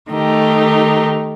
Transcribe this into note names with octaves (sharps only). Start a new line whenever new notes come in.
D#3 A3 D#4 G4